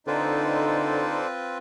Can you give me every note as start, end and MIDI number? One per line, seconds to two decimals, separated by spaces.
0.07 1.21 50
0.07 1.58 60
0.07 1.19 63
0.07 1.58 65
0.07 1.27 69
0.07 1.58 71
0.07 1.27 72
0.07 1.27 74